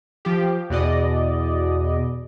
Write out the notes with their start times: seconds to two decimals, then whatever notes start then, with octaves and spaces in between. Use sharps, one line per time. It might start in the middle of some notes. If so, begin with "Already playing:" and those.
0.25 F3 G4
0.70 E2 B2 D5 D#5